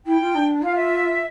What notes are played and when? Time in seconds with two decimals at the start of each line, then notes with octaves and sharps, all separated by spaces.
0.06 E4 G5
0.20 F4
0.34 D4
0.62 F4 F5
0.76 E5